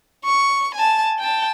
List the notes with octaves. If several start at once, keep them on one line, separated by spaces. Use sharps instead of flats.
C#6
G#5 A5
G5 A5